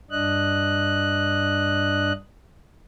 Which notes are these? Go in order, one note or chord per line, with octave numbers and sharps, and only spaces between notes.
G2 D4 D#5 F#6